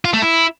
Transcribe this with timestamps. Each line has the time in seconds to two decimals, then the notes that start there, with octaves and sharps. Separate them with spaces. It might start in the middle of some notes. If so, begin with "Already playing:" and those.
0.05 F4
0.13 A3
0.22 E4